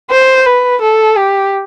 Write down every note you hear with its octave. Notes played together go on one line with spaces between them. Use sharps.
C5
B4
A4
G4